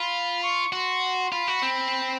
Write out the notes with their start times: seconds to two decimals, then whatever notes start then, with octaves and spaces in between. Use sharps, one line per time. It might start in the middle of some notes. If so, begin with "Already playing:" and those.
Already playing: F4 B5
0.43 C#6
0.72 F#4 C6
1.32 F4 B5
1.48 F#4
1.62 C4